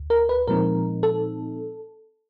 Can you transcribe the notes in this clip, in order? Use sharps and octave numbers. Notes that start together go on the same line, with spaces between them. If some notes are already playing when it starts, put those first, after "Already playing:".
Already playing: D2
A#4
B4
A#2 F3 G#3 C4 D#4 A#4
A4